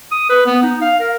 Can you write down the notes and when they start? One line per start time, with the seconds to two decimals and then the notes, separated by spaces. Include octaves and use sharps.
0.11 D#6
0.29 B4
0.46 B3
0.63 D#4
0.81 F5
1.00 A#4